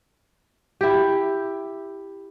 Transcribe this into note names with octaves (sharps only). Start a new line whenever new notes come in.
E4 G4